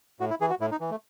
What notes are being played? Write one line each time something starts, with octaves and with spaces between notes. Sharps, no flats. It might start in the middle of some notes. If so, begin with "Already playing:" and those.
A2 F#4
E4
E3 G#4
F#4
A2 E4
D#4
E3
A3